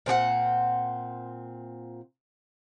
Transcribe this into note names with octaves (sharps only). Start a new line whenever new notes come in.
A#2 C4 G4 F#5